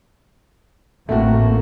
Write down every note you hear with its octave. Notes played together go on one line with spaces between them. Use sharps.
A1 A2 A3 A#3 C4 F#4